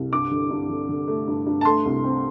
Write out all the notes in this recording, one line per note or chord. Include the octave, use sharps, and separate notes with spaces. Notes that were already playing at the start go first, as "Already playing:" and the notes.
Already playing: C2
G2 D6
D3
G2
D3
D3
A3
G2
G2
A5
A3 C6
C2
C4